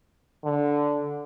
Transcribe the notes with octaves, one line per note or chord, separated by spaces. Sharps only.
D3